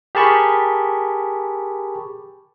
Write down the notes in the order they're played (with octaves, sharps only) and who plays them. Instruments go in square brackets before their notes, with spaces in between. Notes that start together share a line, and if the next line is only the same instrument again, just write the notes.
[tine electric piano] G4 G#4 A#4 A5 B5 C#6